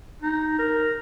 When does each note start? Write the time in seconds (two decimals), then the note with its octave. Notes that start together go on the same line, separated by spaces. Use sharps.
0.22 D#4
0.58 A#4